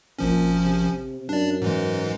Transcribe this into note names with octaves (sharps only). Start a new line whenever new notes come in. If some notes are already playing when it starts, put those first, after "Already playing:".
G#1 A#2 F3 C#4
C3
F#2 D4 D5
G#2 E3 G#3